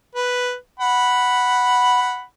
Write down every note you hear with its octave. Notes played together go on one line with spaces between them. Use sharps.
B4
F#5 B5